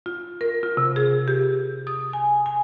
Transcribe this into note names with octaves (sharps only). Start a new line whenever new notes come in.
F4
A#4
F4
C3
G#4
G4
D#6
G#5
G#5